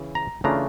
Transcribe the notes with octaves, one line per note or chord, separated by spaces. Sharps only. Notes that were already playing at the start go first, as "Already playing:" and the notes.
Already playing: C#3 E3
A#5
C#3 E3 A3 D4 F4 A#5